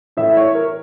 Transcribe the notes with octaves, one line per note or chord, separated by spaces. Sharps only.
A2 E3 E5
C#5
A#4